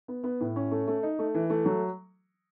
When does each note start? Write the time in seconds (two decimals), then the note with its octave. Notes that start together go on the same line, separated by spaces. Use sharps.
0.08 B3
0.24 B3
0.40 A2
0.56 C#4
0.71 A3
0.87 A3
1.03 D#4
1.19 A3
1.34 E3
1.50 A3
1.65 F#3